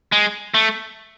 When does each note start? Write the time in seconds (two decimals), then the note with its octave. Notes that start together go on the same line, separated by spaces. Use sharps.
0.12 G#3
0.54 A3